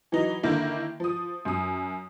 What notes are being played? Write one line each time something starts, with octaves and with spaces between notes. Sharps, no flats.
E3 F#3 D#4
D3 D#3 A#3 E4
F3 D#6
F#2 D#6